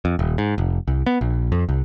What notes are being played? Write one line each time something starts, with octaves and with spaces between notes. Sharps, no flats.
F2
D#1
G#2
F1
C2
B3
A#1
F2
C2